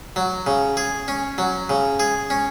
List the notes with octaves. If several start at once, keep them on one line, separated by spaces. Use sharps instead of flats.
F#3
C#3
G#4
C#4
F#3
C#3
G#4
C#4